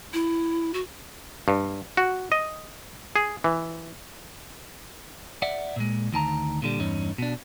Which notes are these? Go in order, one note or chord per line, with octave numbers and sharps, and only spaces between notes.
E4
F#4
G2
F#4
D#5
G#4
E3
D5 E5 F#5
A#2 G#3
D2 D#3 A5 A#5
A#2 D3 G3
E2 G2 C#4 D#4
B2 D4